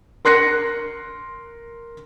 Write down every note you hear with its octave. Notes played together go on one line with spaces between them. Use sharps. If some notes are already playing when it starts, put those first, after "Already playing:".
A#4 C6 F#6 A#6 C#7